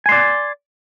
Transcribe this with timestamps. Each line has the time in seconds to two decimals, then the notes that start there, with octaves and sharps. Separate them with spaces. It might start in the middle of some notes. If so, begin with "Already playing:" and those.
0.06 G#5
0.09 C6
0.12 D5